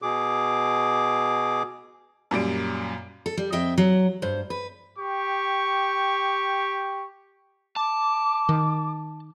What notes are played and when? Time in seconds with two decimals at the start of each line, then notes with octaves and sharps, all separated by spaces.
0.02 B2 G#4 D6
2.31 F#2 A#2 G3 D7
3.26 A4
3.37 G3
3.52 F2 D#5 E5 G5
3.78 F#3
4.22 G2 C5
4.50 B4
4.99 G4 G5 C#6
7.76 A5 D6
8.49 D#3